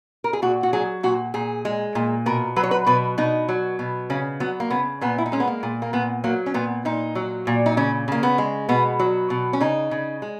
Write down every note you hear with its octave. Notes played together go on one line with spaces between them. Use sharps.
A#4
G#4
A#2 F#4
F#4
F#3 G#4
A#2 F#4
A#2 G#4
G#3
A#2
B2 A#4
F#3 B4
C#5
B4
B2 B4
B2 D#4
F#3
B2
C#3 C#4
F#3 B3
A#3
C#3 B3
A#2 B3
E4
D#4
G#3 C#4
B3
A#3
A#2
A#3
A#2 B3
F#3 A#3
C#4
A#2 B3
A#2 D#4
F#3
A#2
D#4
C#3 C#4
C#3 A#3
B3
G#3
B2 B3
F#3
B2
C#4
C#3 D#4
C#3
G#3